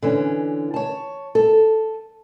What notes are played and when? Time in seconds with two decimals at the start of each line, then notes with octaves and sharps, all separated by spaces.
0.02 D3 E3 C#4
0.74 C#5 A5
1.35 A4